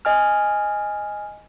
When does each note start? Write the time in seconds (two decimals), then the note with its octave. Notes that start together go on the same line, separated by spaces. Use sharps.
0.05 D#5 G#5 F6